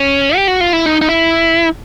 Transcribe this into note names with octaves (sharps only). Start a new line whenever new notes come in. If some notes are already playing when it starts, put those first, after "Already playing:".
Already playing: C#4
G4
F#4
F4
E4
D#4
D#4
E4